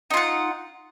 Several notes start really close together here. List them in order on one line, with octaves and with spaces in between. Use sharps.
D#4 F4 F#5